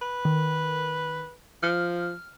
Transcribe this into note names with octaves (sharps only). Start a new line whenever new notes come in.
B4
D#3
F3 F6